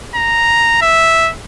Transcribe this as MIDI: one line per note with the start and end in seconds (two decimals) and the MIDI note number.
0.15 0.82 82
0.82 1.32 76